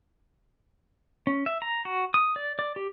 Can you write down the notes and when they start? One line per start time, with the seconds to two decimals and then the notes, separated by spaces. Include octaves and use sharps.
1.27 C#4
1.46 E5
1.62 A#5
1.85 F#4
2.14 D#6
2.36 D5
2.59 D5
2.76 G4